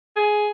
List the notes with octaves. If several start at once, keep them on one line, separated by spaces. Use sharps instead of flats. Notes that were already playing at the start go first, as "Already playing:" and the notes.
G#4